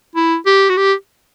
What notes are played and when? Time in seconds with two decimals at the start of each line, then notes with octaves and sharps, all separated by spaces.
0.15 E4
0.46 G4
0.70 F#4
0.77 G4